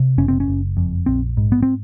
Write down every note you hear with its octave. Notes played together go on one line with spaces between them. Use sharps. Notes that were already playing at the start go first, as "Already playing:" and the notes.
Already playing: C3
F#1 C#4
C4
C#4
F#1
F2
A#1 C4
G#2
B3
C4